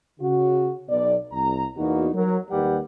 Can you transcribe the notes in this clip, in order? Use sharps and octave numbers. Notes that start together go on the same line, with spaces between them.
C#3 F#4
B1 D5
C2 A#5
E2 A#3 B3 D#4 F#4
F#3 A#4
D#2 G3 G4 A#4 B4 F#5